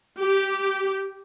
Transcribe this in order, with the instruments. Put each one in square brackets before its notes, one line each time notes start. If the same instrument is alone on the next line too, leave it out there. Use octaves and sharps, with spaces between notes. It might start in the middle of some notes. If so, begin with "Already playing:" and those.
[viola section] G4